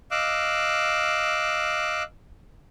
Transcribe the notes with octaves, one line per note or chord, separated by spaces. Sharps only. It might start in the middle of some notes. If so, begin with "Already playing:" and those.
D#5 F5 D6 E6 F#6